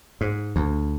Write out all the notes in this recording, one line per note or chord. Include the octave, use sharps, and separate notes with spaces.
G#2
D2